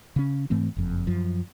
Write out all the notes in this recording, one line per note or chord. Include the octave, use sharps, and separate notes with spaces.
C#3 C#4
G#2 E3 A3 C4
F#1 F2
F#2 F3